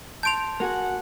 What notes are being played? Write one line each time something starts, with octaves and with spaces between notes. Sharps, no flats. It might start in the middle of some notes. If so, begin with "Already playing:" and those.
A5 C6 G6 D7 F7
A#3 F#4 G#4 F#5